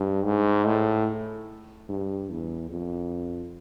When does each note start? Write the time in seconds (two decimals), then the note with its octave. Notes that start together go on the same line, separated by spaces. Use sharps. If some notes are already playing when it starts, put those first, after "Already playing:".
Already playing: G2
0.24 G#2
0.66 A2
1.89 G2
2.30 E2
2.70 F2